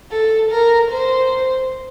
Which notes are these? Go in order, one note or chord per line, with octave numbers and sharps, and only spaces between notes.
A4
A#4
C5